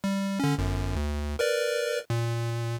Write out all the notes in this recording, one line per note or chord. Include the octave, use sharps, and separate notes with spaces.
G3
D3 C#4
G1 F#2
D2
A#4 B4 D5
A#2